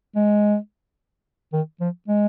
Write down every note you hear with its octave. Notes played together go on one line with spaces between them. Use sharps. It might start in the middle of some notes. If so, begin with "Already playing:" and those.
G#3
D#3
F3
G#3